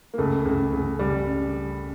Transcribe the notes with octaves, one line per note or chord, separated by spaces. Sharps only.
A#3
C#2 A3
C#2
C#2
C#2 G3